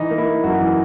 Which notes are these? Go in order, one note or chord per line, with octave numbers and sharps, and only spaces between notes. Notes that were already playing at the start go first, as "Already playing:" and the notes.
Already playing: E3 D#4
A#3
E4
A#3
F#2 F#4
E3